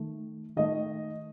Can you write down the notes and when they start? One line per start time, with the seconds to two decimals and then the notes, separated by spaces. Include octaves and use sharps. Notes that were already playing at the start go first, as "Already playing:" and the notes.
Already playing: D#3 A3
0.56 D#3 A3 D#5